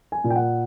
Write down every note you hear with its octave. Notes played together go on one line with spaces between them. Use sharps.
G#5
A#2
G5
F#5